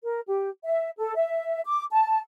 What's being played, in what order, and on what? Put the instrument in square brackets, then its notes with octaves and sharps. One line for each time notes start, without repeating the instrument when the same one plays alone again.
[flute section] A#4
G4
E5
A4
E5
D6
A5